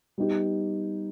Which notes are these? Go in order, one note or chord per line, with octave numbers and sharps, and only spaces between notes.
G3 B3 D#4 G4